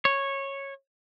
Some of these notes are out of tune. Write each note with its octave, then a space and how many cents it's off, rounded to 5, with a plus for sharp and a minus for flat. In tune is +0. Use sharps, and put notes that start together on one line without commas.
C#5 -10